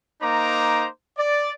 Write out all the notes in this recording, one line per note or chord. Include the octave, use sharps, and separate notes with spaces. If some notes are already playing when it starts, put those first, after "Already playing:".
A#3 D#4 C5 A#5 D6
D5